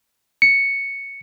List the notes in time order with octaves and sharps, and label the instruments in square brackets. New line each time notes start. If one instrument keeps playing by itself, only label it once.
[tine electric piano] C#7